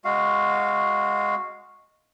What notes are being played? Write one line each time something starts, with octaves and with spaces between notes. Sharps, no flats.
G#3 F#4 F5